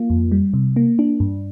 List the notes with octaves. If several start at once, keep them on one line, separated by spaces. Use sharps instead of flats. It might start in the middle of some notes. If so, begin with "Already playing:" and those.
Already playing: A#3 F4
F2
G3
C3
A#3
D4
G2